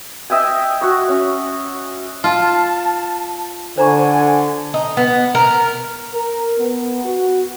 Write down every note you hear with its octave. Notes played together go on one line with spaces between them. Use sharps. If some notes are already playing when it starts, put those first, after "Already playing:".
D#5 E5 G5 G#5
F#4 C#6
C#4
F4 A5
D3 C5 G#5 A#5 C#6
D#4
B3
A#4
A#4
B3
F#4